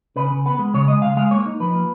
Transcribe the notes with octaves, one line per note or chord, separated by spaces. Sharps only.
C#3 B4
C#3
B3 B4
G#3
C#3 C#5
G#3 D#5
C#3 F5
G#3 F5
A#3 C#5
D#4
F3 B4
A#3